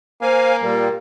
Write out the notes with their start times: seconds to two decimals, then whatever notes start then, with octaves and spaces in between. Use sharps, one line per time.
0.22 A#3 C5 F5 G#5
0.61 A#2 G3 A#4